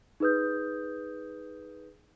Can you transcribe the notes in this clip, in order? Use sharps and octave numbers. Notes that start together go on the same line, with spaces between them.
D#4 G#4 B4 D#6 G6